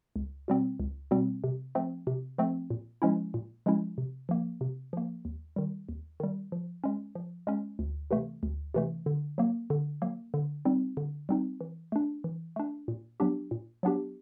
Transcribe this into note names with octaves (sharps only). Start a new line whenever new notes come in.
C#2
B2 G3 C4
C#2
B2 G3 C4
C3
F3 A3 C4
C3
F3 A3 C4
A#2
F3 G#3 C#4 E4
A#2
F3 G#3 C#4 E4
C3
F3 A#3
C3
F3 A#3
D#2
D#3 G3
D#2
D#3 G3
F3
G#3 C#4
F3
G#3 C#4
D2
C3 E3 A3
D2
C3 E3 A3
D3
F#3 A#3
D3
F#3 A#3
D3
G3 C4 D#4
D3
G3 C4 D#4
E3
A3 D4
E3
A3 D4
A#2
F#3 B3 D4 G4
A#2
F#3 B3 D4 G4